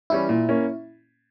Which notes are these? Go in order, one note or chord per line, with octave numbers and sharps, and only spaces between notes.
E3 G3 C#4 E4
A#2
A#3 C#4